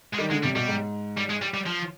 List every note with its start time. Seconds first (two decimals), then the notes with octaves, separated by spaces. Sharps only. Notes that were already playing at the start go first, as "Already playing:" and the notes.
0.14 G#3
0.19 D#3 G3
0.31 D3 G#3
0.43 C3 G3
0.55 B2 G3
0.68 G#2
1.17 G3
1.30 G#3
1.42 G3
1.54 G3
1.66 F3